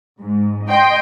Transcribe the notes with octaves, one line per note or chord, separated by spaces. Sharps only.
G#2
D#5 G5 C6